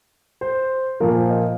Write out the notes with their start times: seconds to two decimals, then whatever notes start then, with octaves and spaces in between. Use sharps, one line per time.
0.41 C5
1.00 A#2 F3 A#3 A#4
1.15 C5
1.30 D#5